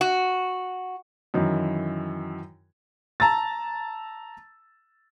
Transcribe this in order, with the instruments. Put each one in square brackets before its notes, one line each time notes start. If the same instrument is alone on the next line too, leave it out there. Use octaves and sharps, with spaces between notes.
[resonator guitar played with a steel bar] F#4
[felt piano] F#2 D#3 E3
[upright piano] A5 A#5 E6 A6